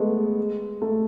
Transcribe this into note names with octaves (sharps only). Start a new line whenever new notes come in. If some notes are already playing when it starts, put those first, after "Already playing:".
Already playing: G#3 A3 B3
A3